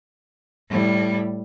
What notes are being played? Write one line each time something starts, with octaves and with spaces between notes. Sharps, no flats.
A2 G3